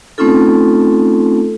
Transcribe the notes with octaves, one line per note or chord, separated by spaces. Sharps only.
A3 C4 C#4 D#4 F4 A4